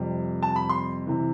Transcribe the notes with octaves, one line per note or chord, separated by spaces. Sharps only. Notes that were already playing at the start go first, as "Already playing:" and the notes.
Already playing: F2 C3 G3 C4
A5
B5
C6
C3 E3